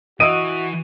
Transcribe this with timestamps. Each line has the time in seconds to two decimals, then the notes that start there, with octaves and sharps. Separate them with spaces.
0.20 E3 F#4 D#5 E5 D7 D#7